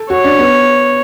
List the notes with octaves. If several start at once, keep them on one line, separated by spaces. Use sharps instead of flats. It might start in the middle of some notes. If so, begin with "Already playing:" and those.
Already playing: A4
F#4 C#5
D4
B3